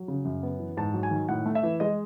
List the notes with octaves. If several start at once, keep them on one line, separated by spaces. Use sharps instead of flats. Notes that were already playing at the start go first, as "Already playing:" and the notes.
Already playing: F#3
C#3
F#2
B3
E3
G#2 A5
F#3
G#5
D#3
A2 F#5
A3
E5
E3
G#3 D#5